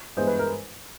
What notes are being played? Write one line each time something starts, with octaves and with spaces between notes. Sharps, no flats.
G2 E3 G#3 B3 C5
B4
A#4